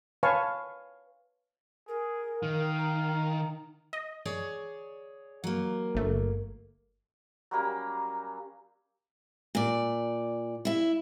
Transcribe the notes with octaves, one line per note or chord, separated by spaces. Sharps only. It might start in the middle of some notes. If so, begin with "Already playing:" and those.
B4 C#5 F5 G#5 A5 C#6
G#4 A#4
D#3 F5
A#5
D#5
G#4 C#5 D5
F#3 A#3
G1 A3
F#3 G3 A#3 C#4
A#2 D5
E4 E5